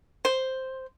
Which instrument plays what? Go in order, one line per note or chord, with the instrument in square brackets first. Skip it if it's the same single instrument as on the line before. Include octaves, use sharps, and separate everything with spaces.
[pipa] C5